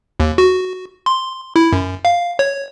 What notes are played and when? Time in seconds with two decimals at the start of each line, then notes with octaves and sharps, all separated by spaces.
0.20 D#2
0.38 F#4
1.06 C6
1.56 E4
1.72 F#2
2.05 F5
2.39 C#5